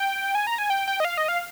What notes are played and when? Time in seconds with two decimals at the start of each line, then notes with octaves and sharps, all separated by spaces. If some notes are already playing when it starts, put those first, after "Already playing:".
Already playing: G5
0.35 G#5
0.47 A#5
0.58 G#5
0.70 G5
0.88 G5
1.00 D#5
1.05 F5
1.18 D#5
1.28 F5